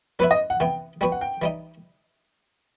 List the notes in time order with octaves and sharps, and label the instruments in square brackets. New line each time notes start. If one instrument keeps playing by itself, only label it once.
[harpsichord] F#3 B3 E4 [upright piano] B4
[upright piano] D#5
F#5
[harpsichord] C3 E3 B3 [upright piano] G5
[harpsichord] G3 B3 F#4 B4 [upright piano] G5
[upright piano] F#5
G5
[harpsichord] E3 G3 D#4